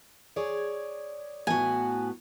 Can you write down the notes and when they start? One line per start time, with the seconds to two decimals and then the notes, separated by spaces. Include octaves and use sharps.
0.36 G#4 C#5 D5
1.47 A2 B3 F#4 G#5